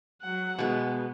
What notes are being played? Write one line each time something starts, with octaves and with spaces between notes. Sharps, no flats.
F#3 F#5
B2 G#3 B3